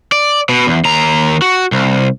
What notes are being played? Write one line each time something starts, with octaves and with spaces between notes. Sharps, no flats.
D5
B2
E2
D#2 A#5
F#4
C2